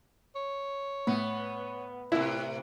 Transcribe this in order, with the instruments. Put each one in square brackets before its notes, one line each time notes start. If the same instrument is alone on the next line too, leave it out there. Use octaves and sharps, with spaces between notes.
[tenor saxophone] C#5
[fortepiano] A2 [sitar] B3
[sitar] A2 C3 [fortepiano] E4